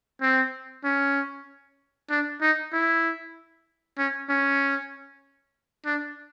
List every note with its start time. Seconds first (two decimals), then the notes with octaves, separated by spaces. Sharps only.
0.22 C4
0.84 C#4
2.10 D4
2.41 D#4
2.73 E4
3.98 C#4
4.29 C#4
5.86 D4